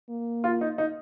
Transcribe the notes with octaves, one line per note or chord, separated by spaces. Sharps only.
A#3
F4
D#4
D#4